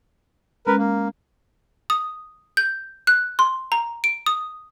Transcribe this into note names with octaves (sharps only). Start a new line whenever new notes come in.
G#3 C#4 A#4 B4
A#3
D#6
G6
F#6
C6
A#5
D7
D#6